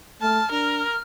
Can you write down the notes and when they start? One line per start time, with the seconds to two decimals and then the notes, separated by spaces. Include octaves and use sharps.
0.21 A3 A5 F6
0.51 D4 A#4